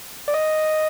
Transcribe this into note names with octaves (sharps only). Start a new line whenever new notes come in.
D5
D#5